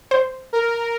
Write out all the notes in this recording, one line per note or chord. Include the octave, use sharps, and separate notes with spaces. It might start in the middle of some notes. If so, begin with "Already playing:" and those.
C5
A#4